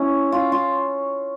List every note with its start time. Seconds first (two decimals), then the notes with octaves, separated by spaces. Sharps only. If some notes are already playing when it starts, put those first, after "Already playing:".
Already playing: C#4 E4
0.32 F4
0.52 F4